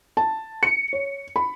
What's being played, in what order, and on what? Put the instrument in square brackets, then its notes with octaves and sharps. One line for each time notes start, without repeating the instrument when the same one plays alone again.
[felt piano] A5
C#7
C#5
B5